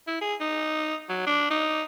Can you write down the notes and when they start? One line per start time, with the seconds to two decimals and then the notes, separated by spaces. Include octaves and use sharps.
0.07 E4
0.21 G#4
0.40 D#4
1.09 F#3
1.26 D4
1.50 D#4